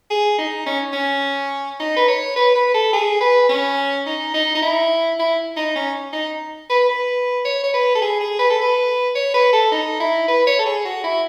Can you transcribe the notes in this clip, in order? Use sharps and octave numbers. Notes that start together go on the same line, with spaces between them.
G#4
D#4
C#4
C#4
D#4
B4
C#5
B4
B4
A4
G#4
B4
C#4
D#4
D#4
D#4
E4
E4
D#4
C#4
D#4
B4
B4
C#5
C#5
B4
A4
G#4
G#4
B4
A4
B4
C#5
B4
A4
D#4
E4
B4
C#5
A4
G#4
F#4
E4